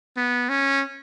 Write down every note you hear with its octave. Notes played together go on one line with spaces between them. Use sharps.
B3
C#4